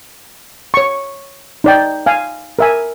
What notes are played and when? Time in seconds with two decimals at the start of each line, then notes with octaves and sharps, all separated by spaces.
0.74 C#5 C#6
1.64 D#4 D5 G5
2.06 F5 G#5
2.59 A#4 E5 G#5